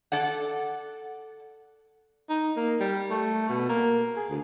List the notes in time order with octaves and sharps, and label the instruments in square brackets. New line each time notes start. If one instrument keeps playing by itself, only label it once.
[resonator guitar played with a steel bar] A4 D5 F#5
[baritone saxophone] D#4
A#3
G3
A3
B2
A#3
G#4
D2